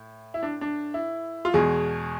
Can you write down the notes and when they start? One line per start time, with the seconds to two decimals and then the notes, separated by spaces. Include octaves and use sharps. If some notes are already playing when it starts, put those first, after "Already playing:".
Already playing: A2
0.34 E4
0.43 D4
0.61 D4
0.94 E4
1.45 F4
1.54 E2 B2 G#3 G#4